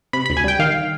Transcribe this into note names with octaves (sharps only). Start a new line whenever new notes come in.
C3 B5
D2 B5
G#5
G3 G5
D#3 F5